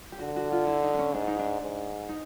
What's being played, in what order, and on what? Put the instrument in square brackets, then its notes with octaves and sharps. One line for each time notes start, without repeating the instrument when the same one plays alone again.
[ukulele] G4
[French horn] D3 [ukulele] F#4
[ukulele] F#4
F4
E4
D#4
D4
C#4
[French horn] G#2 [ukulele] D4
[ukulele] D#4
D4
[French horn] G#2
[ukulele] D#4